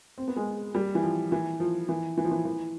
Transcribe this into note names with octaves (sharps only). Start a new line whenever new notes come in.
C4
B3
G#3
G3
E3
F3
E3
F3
E3
E3
F3
E3
E3